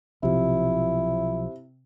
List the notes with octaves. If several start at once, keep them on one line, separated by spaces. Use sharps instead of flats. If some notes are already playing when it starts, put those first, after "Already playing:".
B1 C3 F3 E4